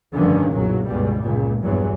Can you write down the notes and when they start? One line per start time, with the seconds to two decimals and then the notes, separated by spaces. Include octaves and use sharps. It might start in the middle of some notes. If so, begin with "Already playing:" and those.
0.14 F1 G2 D3 D#3 F3 C#4
0.51 F#1 B1 A#2 F#3
0.86 G1 C#2 B2 G3
1.22 C#2 A#2
1.63 A#1 E2 G2 E3 F#3